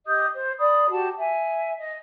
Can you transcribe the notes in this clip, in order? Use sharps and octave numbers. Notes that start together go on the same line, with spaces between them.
G4 D#5 D#6 G6
C5
D5 B5 D#6
F#4 G4 A5
E5 G#5
D#5